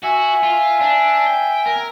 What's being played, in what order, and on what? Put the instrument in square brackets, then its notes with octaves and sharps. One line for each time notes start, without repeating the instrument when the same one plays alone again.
[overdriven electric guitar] F#4 [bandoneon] E5 G#5
[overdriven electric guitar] F4
D4
G5
A#4